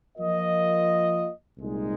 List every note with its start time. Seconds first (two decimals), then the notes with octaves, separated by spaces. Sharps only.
0.17 F3 A#3 F4 A#4 D#5
1.58 C2 A#2 G#3 D#4